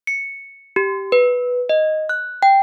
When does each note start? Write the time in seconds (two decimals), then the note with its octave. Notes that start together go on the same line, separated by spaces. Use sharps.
0.07 C#7
0.76 G4
1.12 B4
1.69 D#5
2.09 F#6
2.43 G5